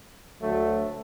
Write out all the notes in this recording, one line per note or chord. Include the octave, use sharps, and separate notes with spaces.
D2 D3 F#3 A3